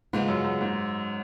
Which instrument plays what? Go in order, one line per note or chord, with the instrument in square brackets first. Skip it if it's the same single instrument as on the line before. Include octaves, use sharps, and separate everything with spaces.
[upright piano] G#2 [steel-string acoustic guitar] C#3 G#3 B3 F4
[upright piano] F#2
F#2
G#2